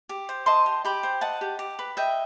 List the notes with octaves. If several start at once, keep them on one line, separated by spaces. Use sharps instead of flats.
G4
C5
D#5 A5 C6
G4
G4 G5 B5
C5
D#5 F#5 A5
G4
G4
B4
D#5 E5 G5